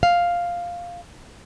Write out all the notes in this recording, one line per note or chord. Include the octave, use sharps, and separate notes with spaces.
F5